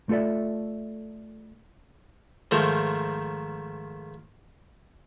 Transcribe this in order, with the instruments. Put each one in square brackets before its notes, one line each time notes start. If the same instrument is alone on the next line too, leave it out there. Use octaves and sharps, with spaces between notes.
[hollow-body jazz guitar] A3 F4 A4 D5 E5
[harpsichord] G#2 D#3 F3 A3